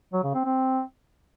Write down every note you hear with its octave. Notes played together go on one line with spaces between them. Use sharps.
F#3
C#3
C4
C4